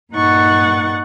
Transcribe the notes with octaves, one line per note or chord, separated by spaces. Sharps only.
G2 A#2 D#4 F#5 C#6 A6